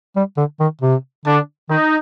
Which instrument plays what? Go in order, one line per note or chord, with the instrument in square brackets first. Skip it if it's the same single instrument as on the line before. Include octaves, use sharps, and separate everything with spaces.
[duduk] G3
D3
D#3
C3
[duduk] D3 [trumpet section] D4
[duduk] D#3 [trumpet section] D#4